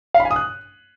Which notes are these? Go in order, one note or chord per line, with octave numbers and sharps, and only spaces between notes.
F5
B5
G#5
D#6
F#6